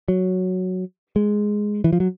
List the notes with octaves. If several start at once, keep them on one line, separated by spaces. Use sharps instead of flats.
F#3
G#3
E3
F3
F#3